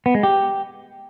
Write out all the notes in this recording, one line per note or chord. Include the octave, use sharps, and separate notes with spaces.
B3
G#3
G4